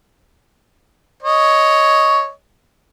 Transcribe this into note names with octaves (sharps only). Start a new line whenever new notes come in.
C#5 D#5